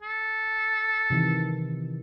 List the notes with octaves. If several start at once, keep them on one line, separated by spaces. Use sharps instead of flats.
A4
C3 D#3 E3